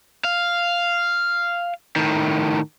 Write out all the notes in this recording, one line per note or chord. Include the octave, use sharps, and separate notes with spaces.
F5
A2 D#3